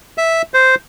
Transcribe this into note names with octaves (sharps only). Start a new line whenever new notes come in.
E5
C5